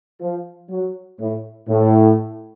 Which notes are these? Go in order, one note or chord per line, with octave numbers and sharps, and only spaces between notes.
F3
F#3
A2
A2